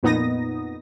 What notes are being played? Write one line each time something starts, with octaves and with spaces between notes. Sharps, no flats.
F2 A#2 B3 D#4 D#6 A#6